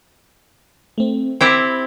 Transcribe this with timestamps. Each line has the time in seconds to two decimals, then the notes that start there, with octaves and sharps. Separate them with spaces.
0.98 A3 C4
1.41 C4 E4 G4 B5 G#6